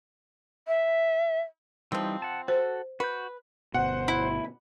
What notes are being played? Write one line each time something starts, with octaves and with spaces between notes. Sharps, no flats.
E5
E3 F3 G3 C4 D#4
F#5 A5
F#4 A4 C5
F#4 B4 G6
G1 B2 C5 F#5
E4